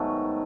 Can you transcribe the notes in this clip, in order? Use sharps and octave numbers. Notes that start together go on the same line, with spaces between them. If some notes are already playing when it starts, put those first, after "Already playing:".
Already playing: G#2 D#3 F#3 A3 B3